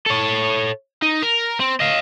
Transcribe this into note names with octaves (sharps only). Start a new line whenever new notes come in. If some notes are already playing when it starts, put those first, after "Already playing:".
A4 C#5
D#4
A#4
C4
D#5 F5